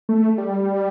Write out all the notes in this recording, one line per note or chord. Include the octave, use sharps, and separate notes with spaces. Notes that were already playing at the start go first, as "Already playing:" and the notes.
A3
G3